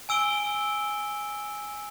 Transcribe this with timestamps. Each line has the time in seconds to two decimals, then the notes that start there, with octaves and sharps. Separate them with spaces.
0.09 G#5 E6 D7 G7